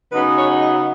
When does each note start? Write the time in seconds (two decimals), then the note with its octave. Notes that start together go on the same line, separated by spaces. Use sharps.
0.12 C#3 F#3 B3 D#4 B4
0.37 C#5
0.61 D#5